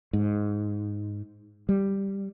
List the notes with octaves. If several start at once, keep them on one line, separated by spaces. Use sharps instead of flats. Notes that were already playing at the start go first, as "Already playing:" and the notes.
G#2
G3